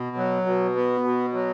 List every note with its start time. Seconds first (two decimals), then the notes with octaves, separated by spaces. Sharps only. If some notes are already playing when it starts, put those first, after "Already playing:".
Already playing: B2
0.16 F#3
0.46 B2
0.76 B3
1.04 B2
1.33 F#3